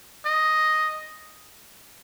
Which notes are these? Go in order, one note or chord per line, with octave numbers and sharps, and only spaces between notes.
D#5